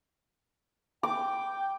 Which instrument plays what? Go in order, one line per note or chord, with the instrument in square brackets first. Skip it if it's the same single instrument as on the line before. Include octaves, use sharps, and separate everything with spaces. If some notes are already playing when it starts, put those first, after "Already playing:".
[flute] G5 [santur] D6